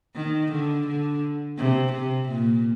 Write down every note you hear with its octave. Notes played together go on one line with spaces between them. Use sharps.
D#3
D3
D3
C3
C3
A#2